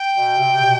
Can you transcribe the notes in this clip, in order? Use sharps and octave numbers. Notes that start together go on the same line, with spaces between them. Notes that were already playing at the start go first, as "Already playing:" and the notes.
Already playing: G5
B2
C3
B2